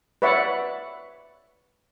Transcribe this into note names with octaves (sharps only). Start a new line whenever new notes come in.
B4 C#5 D5 E5 F#5